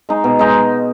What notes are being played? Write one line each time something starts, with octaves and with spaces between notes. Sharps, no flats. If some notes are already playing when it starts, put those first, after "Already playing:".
G#3 D#4
B2
G#3 D#4